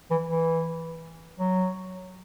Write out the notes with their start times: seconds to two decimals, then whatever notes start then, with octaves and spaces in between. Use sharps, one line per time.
0.11 E3
0.29 E3
1.39 F#3